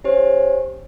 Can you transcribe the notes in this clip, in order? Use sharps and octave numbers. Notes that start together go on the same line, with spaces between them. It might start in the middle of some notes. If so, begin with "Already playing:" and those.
C#4 G4 C5